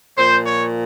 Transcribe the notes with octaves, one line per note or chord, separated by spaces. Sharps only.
A#2 F3 C5
C#5